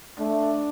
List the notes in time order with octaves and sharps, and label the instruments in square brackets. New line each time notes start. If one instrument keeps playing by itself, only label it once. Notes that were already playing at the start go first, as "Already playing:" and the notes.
[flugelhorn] A3 [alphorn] D4